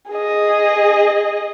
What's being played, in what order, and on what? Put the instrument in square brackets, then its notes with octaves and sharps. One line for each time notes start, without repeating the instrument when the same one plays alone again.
[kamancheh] G#4 D#5